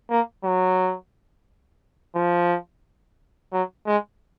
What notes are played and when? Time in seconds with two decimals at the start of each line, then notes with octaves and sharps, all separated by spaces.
0.10 A#3
0.44 F#3
2.15 F3
3.52 F#3
3.87 G#3